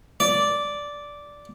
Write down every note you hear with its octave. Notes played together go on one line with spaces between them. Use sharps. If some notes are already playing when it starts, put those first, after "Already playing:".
D5